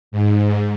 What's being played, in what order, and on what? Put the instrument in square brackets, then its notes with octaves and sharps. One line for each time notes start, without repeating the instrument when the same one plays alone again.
[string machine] G#2